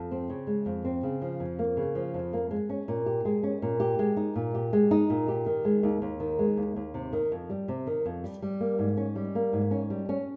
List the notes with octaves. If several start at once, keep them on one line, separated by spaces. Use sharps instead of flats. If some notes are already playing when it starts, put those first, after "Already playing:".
Already playing: F2
C4
C#3
G#3
F2
C4
C#3
F3
F2
A#3
C#3
F3
F2
A#3
G#3
C#4
A#2
G4
G#3
C#4
A#2
G4
G#3
D#4
A#2
G4
G#3
D#4
A#2
G4
D#3
G#3
D#2
D#2
D#3
G#3
D#2
D#2
C3
D#3
F2
G3
C3
D#3
F2
G3
G3
A#3
G#2
C#4
G3
A#3
G#2
C#4
G3
C#4